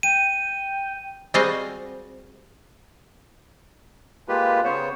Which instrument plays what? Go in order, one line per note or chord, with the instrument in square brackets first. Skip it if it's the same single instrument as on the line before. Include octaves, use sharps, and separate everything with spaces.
[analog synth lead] G5 [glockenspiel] D#7
[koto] G3 G#3 C4 F#4 D#5 F5
[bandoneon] G#3 A#3 F4 G4 B4
C#3 B3 C5 C#5